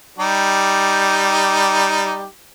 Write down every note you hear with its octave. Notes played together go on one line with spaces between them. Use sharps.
G3 D#4 G4